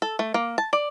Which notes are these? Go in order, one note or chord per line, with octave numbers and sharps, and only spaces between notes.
A4
A3
A#3
A5
D5